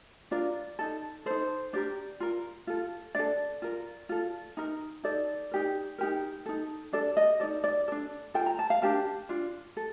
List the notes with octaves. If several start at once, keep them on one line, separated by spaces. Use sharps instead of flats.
D4 F4 A#4 D5
D#4 A4
D#4 A4 C5
D4 G4 A#4 D5
F4 A#4
F4 A4
D4 A4 D5
F4 A#4
F4 A4
D#4 A#4
D#4 A4 D5
D#4 G4 A#4
D#4 G4 A#4
D#4 A4
D4 A4 D5
D#5
D#4 A4 D5
D5
D4 A4 D5
F4 A4 G5
A#5
A5
F5
D4 G4 A#4 A5
D4 F4
A4